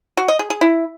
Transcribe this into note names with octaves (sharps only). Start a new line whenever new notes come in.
F#4
D#5
G#4
G#4
E4